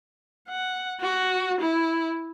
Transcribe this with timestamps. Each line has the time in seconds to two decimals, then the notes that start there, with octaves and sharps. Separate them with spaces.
0.48 F#5
1.01 F#4
1.61 E4